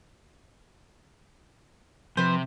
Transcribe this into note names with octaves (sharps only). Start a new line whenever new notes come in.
C3 F3 B4 C5